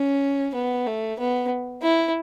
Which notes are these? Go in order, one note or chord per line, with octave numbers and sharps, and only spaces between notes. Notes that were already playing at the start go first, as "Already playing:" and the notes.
Already playing: C#4
B3
A3
B3
E4